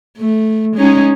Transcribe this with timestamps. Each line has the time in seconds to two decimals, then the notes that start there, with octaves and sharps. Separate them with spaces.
0.18 A3
0.76 G#3 C#4 D#4